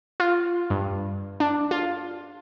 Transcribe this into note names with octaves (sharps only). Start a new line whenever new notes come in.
F4
G2
D4
F4